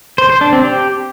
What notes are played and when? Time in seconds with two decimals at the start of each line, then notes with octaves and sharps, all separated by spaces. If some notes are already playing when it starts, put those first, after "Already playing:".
0.18 C5
0.30 C5
0.41 D4
0.53 C4
0.64 G4